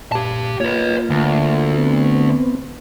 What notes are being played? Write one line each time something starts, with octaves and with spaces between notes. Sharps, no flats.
A#2 G4 A5
A#3 F4 B4 C#5
D2
B3 C4